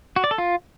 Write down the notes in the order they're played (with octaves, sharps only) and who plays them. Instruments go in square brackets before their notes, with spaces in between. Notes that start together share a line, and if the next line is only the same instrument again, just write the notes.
[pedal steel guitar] F#4
D5
A4
F4